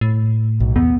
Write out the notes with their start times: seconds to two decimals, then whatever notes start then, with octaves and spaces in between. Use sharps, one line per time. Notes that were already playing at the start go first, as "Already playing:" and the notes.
0.01 A2
0.60 B1
0.76 E2 B3